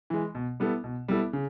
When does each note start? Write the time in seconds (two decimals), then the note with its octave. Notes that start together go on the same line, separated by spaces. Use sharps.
0.10 E3 G#3
0.35 B2
0.60 G3 B3 E4 A4
0.84 B2
1.08 G3 B3 E4 A4
1.33 C#3